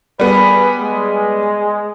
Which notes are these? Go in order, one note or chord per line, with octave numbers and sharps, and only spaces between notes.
G3 B3 G#4 B4 B5
G#3